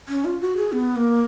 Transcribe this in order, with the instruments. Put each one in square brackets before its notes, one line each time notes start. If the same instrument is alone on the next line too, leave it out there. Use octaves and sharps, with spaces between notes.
[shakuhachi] C#4
F4
F#4
G#4
B3
A#3